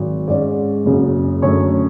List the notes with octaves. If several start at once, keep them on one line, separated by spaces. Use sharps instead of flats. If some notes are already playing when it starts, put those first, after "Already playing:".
Already playing: G#1 F#3
G#2 G#3 C#4 D5
F#1 F#2 C#3
F#2 D3 A3 C#4 C#5